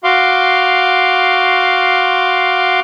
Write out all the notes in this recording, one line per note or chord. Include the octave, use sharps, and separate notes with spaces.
F#4 F5 C6 D6